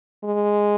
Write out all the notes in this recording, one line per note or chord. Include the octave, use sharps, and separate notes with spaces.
G#3